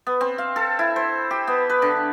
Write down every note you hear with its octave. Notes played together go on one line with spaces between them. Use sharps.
B3
C4
F5
A4
E4
C5
G4
B3
B4
D3